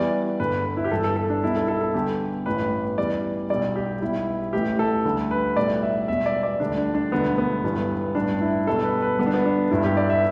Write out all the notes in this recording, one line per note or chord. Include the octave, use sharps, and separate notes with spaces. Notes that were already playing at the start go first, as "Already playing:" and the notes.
Already playing: E2 E3 G3 D5
G1 G2 D3 B4
B4
E4
G4
G1 G2 E3 A4
A4
A4
D4
B1 B2 G3 E4
A4
A4
A4
E2 D3 G3 G4
A1 G2 E3 B4
E2 E3 G3 D5
B1 B2 G3 D5
G4
B1 B2 G3 E4
A1 A2 E3 G4
A4
D2 D3 G3
B4
B1 A2 G3 D5
E5
E1 E2 B2 G3 E5
D5
D5
D2 D3 G3 D4
D4
D4
E1 D2 D3 G3 B3
B3
G1 G2 E3 G3
A1 G2 G3 D4
E4
E2 B2 G3 A4
B4
B4
G1 G2 D3 G3 B3
D4
B3
D4
G1 G2 G3 E4
G4
D5
E5